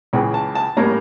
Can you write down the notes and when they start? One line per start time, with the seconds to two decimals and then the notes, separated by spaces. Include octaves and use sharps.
0.13 C#2 C#3 E3
0.34 A5
0.55 A5
0.77 A2 G3 A#3 C#4 A#5